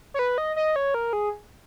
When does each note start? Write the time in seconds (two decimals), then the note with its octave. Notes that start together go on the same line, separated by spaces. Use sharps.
0.14 C#5
0.19 B4
0.38 D#5
0.56 D#5
0.76 C#5
0.94 A#4
1.13 G#4